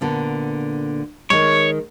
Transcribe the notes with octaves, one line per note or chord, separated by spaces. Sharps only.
A#2 D3 B3
D#3 G#3 C#5